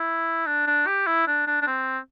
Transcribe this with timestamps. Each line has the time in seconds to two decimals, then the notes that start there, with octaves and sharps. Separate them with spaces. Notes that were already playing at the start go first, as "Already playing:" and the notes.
Already playing: E4
0.46 D4
0.67 D4
0.87 G4
1.07 E4
1.27 D4
1.47 D4
1.62 D4
1.67 C4